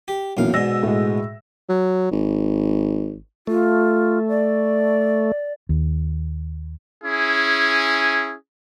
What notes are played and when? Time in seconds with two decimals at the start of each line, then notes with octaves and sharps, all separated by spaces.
0.08 G4
0.37 B1 F#2 A#2 E3 F5
0.54 G#2 B2 D5 E6 A#6
0.83 A2 G#3
1.69 F#3
2.11 G#1
3.47 A3 F4
4.29 D5
5.69 D#2
7.04 C#4 E4 G#4